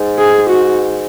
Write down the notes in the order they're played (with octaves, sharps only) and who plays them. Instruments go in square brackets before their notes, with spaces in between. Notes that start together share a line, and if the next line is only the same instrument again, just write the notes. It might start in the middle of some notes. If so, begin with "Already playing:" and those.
Already playing: [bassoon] G#2
[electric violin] G#4
F#4